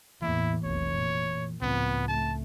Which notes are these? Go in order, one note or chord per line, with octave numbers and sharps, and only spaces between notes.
E2 A2 E3 A#3 E4
F1 B1 C#5
A#2
C#2 A2 F3 B3 C4
A3 A5